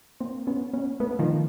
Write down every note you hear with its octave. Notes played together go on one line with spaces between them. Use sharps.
A#3 C4
B3 C#4
B3 C#4
A3 B3
D#3 F3